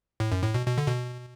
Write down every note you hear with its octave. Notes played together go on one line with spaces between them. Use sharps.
A2
F#2
A2
B2
B2
D3
B2